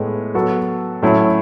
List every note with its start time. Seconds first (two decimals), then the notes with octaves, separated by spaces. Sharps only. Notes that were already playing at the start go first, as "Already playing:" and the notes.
Already playing: A2 G#3 B3
0.34 F#3 B3 F#4 A4
1.02 A2 F#3 A3 C#4 E4